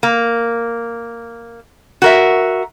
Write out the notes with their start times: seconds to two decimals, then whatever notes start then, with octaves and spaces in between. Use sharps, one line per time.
0.03 A#3
2.02 F#4 A#4 E5